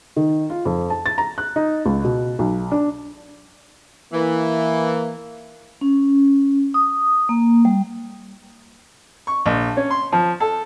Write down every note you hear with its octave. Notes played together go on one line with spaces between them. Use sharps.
D#3
F4
F2
A5
A6
A#5
F#6
D#4
C#2
B2
B1
D4
E3 A#3
C#4
D#6
A#3
G3
C#6
A#1
C#4
C6
F3
A4